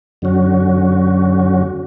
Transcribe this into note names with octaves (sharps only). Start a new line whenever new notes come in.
F#2 D3 F#3 C#4 F#4